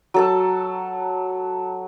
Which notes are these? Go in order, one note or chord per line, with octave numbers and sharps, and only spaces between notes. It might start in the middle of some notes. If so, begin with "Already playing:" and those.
F#3 A4 A5